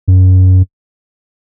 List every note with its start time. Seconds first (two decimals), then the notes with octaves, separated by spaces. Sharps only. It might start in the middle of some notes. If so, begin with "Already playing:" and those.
0.08 F#2